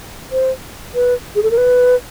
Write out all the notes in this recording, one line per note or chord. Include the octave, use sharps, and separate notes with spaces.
C5
B4
G#4
A4
A#4
B4